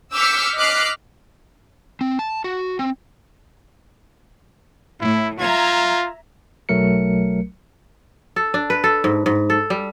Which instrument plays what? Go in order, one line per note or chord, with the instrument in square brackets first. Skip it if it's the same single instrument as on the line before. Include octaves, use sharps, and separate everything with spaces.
[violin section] D6 E6 F6 G6 B6 C#7
D#5 D6 F6 F#6 B6 C7
[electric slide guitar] C4
A5
F#4
C4
[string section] A2 [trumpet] E4
[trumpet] F4 [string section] E5 A#5 G#6
[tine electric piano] B1 F#3 A3 A#4 C#7
[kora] A4
D4
B4
A4
G#2
G#2
A4
G3